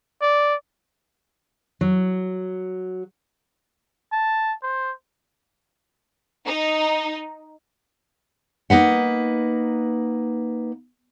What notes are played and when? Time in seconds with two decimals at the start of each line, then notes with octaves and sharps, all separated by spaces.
0.21 D5
1.81 F#3
4.12 A5
4.63 C5
6.47 D#4
8.70 A#3 D#4 B4 F#5